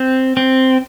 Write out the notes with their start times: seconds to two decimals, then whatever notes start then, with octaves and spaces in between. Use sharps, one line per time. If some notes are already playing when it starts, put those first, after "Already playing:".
Already playing: C4
0.37 C4